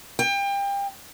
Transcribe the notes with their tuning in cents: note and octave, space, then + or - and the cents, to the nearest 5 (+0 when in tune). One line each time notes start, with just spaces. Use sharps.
G5 +30